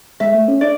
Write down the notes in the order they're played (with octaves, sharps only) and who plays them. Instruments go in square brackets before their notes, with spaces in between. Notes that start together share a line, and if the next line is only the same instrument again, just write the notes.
[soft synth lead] G#3 [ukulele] E5
[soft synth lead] A3
C#4
[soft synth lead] D4 [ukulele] D5